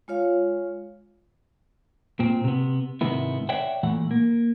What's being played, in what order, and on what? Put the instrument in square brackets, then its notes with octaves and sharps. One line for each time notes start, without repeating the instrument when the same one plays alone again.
[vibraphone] G#3 F4 C#5 F5
[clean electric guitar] A#2 C4
C3 B3
G#2 C3 D#3 B3 E4
C#5 D5 E5 F#5 G5
A#2 E3 A3 F#5
A#3